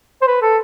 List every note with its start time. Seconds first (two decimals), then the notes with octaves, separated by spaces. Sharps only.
0.22 C5
0.27 B4
0.42 A4